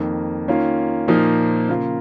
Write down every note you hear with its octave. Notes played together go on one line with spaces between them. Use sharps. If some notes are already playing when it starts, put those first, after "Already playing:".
Already playing: F2 D#3 A#3
D#3 A#3 C#4 F4
A#2 F3 A#3 D#4
C#3 A#3 F4